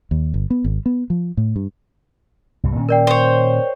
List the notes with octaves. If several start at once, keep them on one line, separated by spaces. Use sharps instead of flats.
D#2
G1
B3
G#1
B3
F3
A2
G2
C2 G2
A#2 D#3 C#4
A#4 D5 G5
C5 C#5